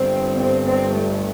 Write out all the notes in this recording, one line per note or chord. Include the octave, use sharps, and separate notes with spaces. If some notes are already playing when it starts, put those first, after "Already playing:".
Already playing: G1 G2 C4
C4
C4
A3